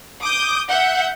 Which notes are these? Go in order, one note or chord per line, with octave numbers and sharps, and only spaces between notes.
D6 D#6 G6
E5 F#5 G6